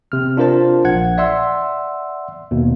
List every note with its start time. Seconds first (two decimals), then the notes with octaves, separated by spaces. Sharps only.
0.12 C3 F6
0.37 D4 F4 A#4 C5 A5
0.84 A#1 F#5 G#6
1.18 D5 E5 F#5 C6 E6
2.51 D#2 B2